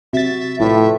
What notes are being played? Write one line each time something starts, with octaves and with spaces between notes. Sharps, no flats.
C3 F#4 E5 A6
A2 E4 F4 B4 E5